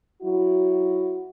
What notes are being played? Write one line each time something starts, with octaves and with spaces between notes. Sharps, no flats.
F#3 E4 F#4